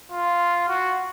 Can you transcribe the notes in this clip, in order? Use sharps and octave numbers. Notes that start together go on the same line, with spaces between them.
F4
F#4